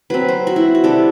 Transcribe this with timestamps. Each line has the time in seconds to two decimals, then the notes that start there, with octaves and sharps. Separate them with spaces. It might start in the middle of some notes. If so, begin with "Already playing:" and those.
0.10 F#3 C4 B4
0.28 C5
0.47 F#4
0.56 E4
0.75 F#4
0.84 C3 G3 D4 A4